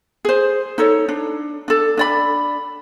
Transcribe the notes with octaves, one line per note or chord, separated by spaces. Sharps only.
G#4 C5
D#4 A4 C#5
D4
D4 A4
D4 D5 B5